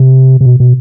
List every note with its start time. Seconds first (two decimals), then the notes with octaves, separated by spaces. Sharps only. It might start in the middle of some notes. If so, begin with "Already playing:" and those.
Already playing: C3
0.41 C3
0.45 B2
0.60 B2